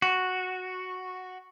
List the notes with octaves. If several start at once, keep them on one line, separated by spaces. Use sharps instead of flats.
F#4